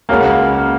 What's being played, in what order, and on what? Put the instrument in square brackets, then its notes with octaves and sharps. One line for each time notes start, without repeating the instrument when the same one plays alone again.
[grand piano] C#2 C#3 G#3 C#4 F#4 [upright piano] A#3